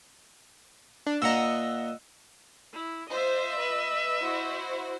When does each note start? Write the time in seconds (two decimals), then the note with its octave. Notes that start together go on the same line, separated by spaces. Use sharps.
1.06 D4
1.22 A#2 D#5 F#5 A#5 E6
2.74 E4
3.10 F4 C5 D#5 E5
3.59 B4
4.22 E4 F#4 C5